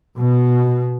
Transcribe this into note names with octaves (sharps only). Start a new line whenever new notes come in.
B2